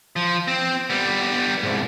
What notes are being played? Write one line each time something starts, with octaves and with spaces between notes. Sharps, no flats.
F3
C4
G3 B3
C2 G#2